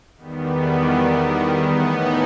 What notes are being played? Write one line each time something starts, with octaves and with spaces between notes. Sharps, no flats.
E2 D#3 G3 B3
A2 E3 B3 D#4